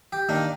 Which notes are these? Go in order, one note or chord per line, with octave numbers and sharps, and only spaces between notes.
G4
D#3 A#3 D4